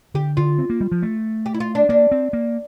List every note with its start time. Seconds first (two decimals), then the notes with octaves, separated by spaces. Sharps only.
0.14 D3 G4
0.37 D3 F4
0.59 C4
0.70 A#3
0.81 G3
0.92 F3
1.02 A3
1.46 G4
1.54 E4
1.60 F4
1.75 D4
1.89 A#3 D4
2.11 C4
2.33 A#3